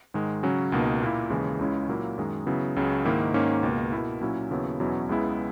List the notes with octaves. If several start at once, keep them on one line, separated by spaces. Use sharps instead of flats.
G#2 D#3 G#3
C#3 F#3 C#4
C#2 B2 A#3 D#4
A#2 A#3 E4
D#2 C#3 E3 G#3
C#2 C#3 G#3 C#4 E4
A#2 F#3 A#3 E4
F#2 D#3 G#3
C#3 F#3 B3 E4
C#2 C#3 F#3
G#2 D#3 A#3 E4
G#2 D#3 A#3 C#4
C#2 B2 A#3
B2 A#3 E4
A#2 F#3 C#4 E4
D#2 C#3 F#3 B3 E4
E2 B2 F#3 C#4 E4
C#2 C#3 G#3 B3 E4